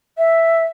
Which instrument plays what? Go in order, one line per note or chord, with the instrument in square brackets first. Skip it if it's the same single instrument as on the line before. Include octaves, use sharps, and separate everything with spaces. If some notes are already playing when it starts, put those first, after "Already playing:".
[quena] E5